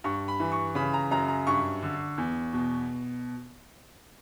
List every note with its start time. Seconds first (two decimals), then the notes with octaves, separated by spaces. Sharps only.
0.04 G2 C#6
0.28 B5
0.40 E3
0.52 C#6
0.75 C#3 B5
0.93 A#5
1.11 F#2 A#5
1.28 A#5
1.47 G2 C#6
1.83 D3
2.18 E2
2.53 B2